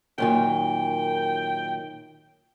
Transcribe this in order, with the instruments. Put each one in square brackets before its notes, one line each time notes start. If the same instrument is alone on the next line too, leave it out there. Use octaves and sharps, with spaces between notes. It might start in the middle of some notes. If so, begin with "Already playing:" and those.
[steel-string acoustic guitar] F#2 A#2 D#3 [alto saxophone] G5